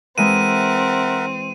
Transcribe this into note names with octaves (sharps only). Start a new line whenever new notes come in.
E3 G#3 C4 A#4 E5 F#5 D#7